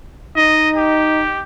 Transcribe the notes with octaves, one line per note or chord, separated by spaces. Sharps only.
D#4 D#5
G4